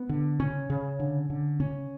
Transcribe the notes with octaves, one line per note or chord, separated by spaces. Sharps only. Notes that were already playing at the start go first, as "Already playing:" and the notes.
Already playing: B3
D3
C#3 C#4
C#3
D3
D3
C#3 C#4